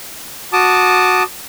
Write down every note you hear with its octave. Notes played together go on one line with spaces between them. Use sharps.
F#4 A5 D6 D#6